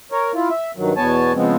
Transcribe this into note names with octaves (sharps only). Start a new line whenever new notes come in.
A#4 C#5
E4 F4
E5
G2 D#3 F#3
E2 B2 B3 C#5 G#5 A5
C#3 F3 G#3 B3 C4